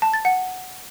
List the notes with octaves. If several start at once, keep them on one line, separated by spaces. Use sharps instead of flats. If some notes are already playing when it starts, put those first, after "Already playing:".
A5
A6
F#5